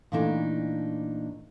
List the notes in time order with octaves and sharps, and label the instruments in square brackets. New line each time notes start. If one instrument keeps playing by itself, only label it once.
[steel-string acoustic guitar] A#2 E3 A3 D4 D#4